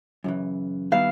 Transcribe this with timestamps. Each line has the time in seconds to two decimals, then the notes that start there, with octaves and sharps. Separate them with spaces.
0.24 F#2 C#3 E3
0.92 D#3 G3 B3 E4 F5